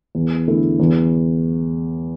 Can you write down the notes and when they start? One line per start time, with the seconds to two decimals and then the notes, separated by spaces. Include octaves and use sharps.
0.15 E2
0.48 D3 A3 E4
0.80 E2